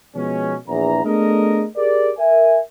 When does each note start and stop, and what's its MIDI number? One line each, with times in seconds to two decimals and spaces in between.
0.15 0.56 47
0.15 0.56 53
0.15 0.56 56
0.15 0.56 59
0.15 0.56 61
0.68 1.02 34
0.68 1.02 40
0.68 1.02 82
1.04 1.65 57
1.04 1.65 59
1.04 1.65 62
1.04 1.65 68
1.04 1.65 70
1.04 1.65 75
1.77 2.11 67
1.77 2.11 68
1.77 2.11 70
1.77 2.11 74
2.18 2.58 70
2.18 2.58 76
2.18 2.58 80